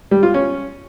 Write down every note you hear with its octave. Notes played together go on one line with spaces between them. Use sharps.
G3
F4
C#4